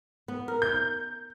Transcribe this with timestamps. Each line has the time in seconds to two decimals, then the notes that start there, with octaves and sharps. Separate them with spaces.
0.28 B3
0.48 A#4
0.62 G6